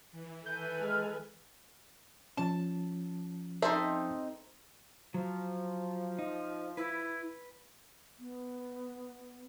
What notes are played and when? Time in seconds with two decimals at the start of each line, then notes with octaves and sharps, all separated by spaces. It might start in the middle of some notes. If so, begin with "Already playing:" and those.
0.12 E3
0.46 A4 B4 G#5 G6
0.81 G#3 F6
2.37 F3 C#4 A5
3.62 C4 D#4 A4 C5 E5
5.14 F3 F#3
6.19 D#4
6.77 E4 B4
8.19 B3